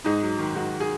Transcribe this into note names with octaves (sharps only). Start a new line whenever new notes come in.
G#2 D#4
F#3
D#3
G#2 F#4
G#4